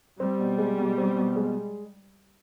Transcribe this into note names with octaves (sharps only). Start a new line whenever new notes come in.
G3 C4
B2
G#3
B2
C4
B2
G#3